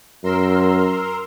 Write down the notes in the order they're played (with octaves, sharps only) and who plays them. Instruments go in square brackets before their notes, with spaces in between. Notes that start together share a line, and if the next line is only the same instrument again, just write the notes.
[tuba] F#2 [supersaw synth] A#4 C6 E6